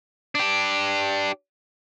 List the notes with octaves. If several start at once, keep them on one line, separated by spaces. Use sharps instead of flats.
D4 G4